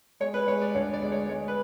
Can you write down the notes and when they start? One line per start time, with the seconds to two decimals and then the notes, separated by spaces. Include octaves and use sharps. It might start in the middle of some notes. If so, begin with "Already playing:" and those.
0.20 G#3 C#5
0.34 B4
0.47 G#3 C#5
0.62 D5
0.74 D2 C#5
0.93 D5
1.02 G#3
1.12 C#5
1.29 G#3 C#5
1.48 B4